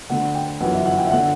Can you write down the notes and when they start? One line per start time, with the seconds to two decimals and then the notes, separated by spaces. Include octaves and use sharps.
0.10 D2 D3 F#5
0.35 G5
0.60 G1 F#2 E3 F#5
0.73 E5
0.86 F#5
0.98 G5
1.05 E5
1.11 D3 F#5